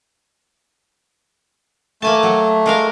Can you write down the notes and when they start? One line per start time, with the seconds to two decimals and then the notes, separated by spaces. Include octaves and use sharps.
2.02 A3 A#3 G#5 A5
2.23 F#3
2.66 G#3 A#4 F5